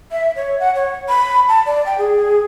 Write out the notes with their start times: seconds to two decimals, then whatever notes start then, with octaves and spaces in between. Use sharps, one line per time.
0.12 E5
0.36 C#5
0.60 F#5
0.75 C#5
1.09 B5
1.48 A5
1.66 D5
1.86 G5
1.98 G#4